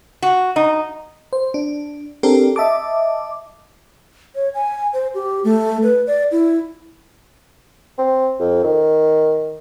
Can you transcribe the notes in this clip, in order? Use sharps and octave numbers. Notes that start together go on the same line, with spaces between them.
F#4
D#4
C5
D4
C4 D4 G4 A4 A#4
D#5 E5 A5 D6
C#5
G#5
C5
G4
A3
B4
D5
E4
C4
F2
D#3